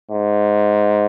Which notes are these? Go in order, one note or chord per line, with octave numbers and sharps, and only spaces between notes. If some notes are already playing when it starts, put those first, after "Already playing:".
G#2